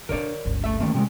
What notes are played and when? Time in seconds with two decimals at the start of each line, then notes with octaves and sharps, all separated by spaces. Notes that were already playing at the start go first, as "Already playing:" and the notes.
0.09 D3 D4 A#4 C#5 D5
0.45 G1 C#2
0.64 A3 E5
0.80 D#3 A3 A#3 C#4
0.94 C3 F#3 G#3